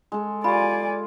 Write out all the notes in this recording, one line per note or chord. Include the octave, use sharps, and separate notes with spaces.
G#3 A4
F4 G4 D5 G#5 B5